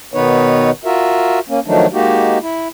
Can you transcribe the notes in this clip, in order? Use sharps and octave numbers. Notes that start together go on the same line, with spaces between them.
B2 D#3 B3 D#4 B4 C#5
F4 F#4 A#4 E5
A#3 C#4
D#3 F3 F#3 A3 D4 D#4
G#3 A#3 D#4 F#4 G4
E4